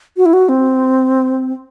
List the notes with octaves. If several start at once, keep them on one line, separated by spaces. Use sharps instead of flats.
F#4
E4
F#4
C4